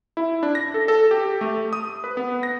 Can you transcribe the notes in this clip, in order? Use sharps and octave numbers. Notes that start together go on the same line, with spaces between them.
E4
D4
A#6
A4
A4
G4
A3
D#6
B4
B3
A#6